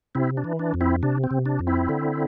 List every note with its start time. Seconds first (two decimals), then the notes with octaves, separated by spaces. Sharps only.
0.15 C3 C4 E4
0.37 D4
0.44 E3
0.59 D4
0.74 F2
0.81 C4 E4
1.03 C3 D4
1.24 C4
1.31 C3
1.46 D4
1.59 F2
1.67 C4 E4
1.89 D3